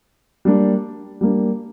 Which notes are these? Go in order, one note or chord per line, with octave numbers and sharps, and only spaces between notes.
G3 A#3 D4
G3 A#3 D4